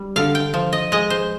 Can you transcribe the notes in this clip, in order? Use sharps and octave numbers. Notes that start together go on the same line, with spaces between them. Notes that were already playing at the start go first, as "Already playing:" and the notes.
Already playing: G3
D3 F5
G5
F3
D#5
G#3 D#5
C5